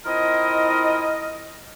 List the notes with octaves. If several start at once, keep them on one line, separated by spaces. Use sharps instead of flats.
C4 E4 F4 A#4 D#5